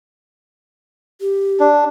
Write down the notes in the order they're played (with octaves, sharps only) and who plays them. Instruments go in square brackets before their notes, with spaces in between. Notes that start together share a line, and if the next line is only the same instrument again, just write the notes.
[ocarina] G4
[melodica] D4